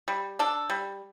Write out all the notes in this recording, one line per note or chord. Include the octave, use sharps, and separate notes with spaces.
G3
D4 A4
G3